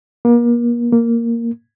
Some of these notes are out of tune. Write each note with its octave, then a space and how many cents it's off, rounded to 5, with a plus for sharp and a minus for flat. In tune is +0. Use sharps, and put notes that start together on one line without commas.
A#3 +35
A#3 -5